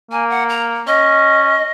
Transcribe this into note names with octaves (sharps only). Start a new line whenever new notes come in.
A#3 G#5
F#5
A#5
C#4 D#5